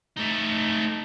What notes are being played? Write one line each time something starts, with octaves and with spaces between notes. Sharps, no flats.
A3 D#4